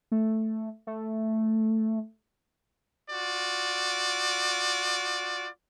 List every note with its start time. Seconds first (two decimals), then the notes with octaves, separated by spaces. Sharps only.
0.11 A3
0.87 A3
3.09 F4 F#4 D5